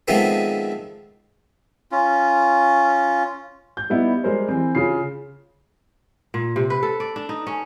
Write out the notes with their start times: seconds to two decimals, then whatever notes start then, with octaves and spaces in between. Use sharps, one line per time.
0.08 D#3 F3 G#3 A3 B3 C4
1.92 C#4 F4
3.77 G6
3.90 G3 B3 D#4 E4
4.24 G3 G#3 A#4 C5
4.49 E3 C4
4.75 C#3 F4 C7
6.34 A#2
6.56 C3
6.70 B4
6.83 A4
7.00 D5
7.16 D4
7.29 D#4
7.47 C#4